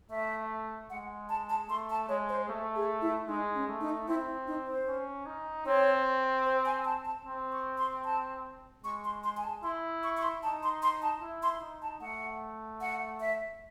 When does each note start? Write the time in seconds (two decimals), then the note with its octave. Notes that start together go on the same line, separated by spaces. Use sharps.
0.10 A3 E5
0.90 G#3 F#5
1.29 A5
1.49 A5
1.69 A3 C6
1.90 A5
2.09 G#3 C#5
2.29 C5
2.48 A3
2.76 G#4
3.01 E4
3.28 G#3 D#4
3.54 C#4
3.68 A3
3.81 D#4
4.08 C4 E4
4.47 D#4
4.67 C5
4.87 C#4
5.26 D#4
5.66 C4 C#5
6.46 C5
6.65 G#5
6.85 A5
7.05 A5
7.25 C4
7.52 C#6
7.78 C6
8.04 A5
8.84 G#3 C#6
9.04 C6
9.24 C6
9.37 G#5
9.44 A5
9.63 E4 C6
10.03 C#6
10.17 C#6
10.23 C6
10.43 D#4 A5
10.63 C6
10.82 C6
11.02 A5
11.22 E4
11.42 C6
11.61 D#4
11.82 A5
12.01 A3 F#5
12.81 F#5
13.20 E5